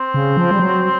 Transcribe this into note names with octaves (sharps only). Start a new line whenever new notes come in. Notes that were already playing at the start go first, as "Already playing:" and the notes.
Already playing: C4
C#3
F3
G3
F#3